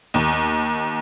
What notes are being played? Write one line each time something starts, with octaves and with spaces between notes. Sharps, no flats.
D#2